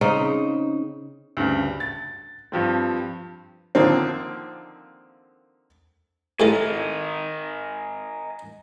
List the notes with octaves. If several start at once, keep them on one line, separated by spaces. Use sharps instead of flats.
C#3 C4 D#4
D2 G2 C#3
A6
G2 F3 C4
D3 D#3 F3 A#3 C4
A2 G#3 A4 A#4 D#5 G#5